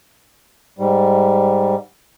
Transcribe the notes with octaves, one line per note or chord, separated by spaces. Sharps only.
G#2 G3